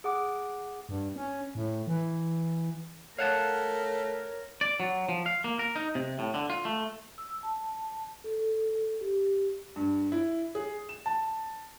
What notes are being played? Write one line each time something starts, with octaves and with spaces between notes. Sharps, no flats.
G#4 F#5 D6
G2
C#4
A2
E3
A3 A#4 C#5 F5 F#5 A5
D5
F#3
F3
F5
A#3
A#4
D#4
C3
A2
D3
F4
A3
E6
A5
A4
G4
G2
E4
G#4
E7
A5